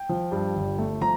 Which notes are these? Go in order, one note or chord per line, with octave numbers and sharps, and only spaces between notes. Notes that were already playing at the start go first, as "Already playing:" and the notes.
Already playing: G5
F3
G2
G1
A3
F3 A#5